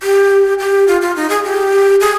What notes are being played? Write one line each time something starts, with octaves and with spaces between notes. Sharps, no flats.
G4
G4
F4
F4
D#4
G#4
G4
G#4